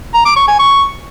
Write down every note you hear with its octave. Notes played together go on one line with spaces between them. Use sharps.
A#5
D6
C#6
G#5
C#6